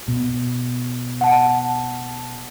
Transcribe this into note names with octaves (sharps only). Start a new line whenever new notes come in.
B2
F#5 A5